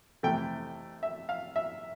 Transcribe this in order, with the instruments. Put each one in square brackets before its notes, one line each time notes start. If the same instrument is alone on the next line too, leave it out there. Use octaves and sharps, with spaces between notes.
[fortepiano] F2 C3 E3 A3 G5
E5
F5
E5